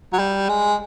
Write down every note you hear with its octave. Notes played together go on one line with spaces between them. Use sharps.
F#3
G3
G#3